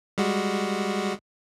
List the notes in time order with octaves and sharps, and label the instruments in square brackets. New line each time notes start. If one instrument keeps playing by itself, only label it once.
[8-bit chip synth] G3 G#3 F#4